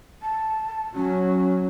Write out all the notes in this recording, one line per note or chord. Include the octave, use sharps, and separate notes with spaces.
A5
F#3 C#4